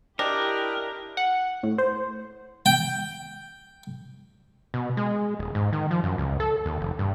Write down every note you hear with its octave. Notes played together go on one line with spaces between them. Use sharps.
D4 E4 G4 A#4 D#5 G5
F#5
A2
C5
G5
B2
G#3
D#1
G#2
D#3
F3
F#2
C#2
A4
D#2
F1
G2